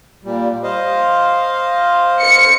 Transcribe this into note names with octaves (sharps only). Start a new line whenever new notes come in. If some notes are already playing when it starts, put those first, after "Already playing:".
A#2 G3
C5 D#5 F5
C#7